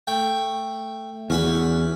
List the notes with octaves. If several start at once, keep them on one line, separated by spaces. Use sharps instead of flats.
A3 G5
E2 C#4 F#4 B5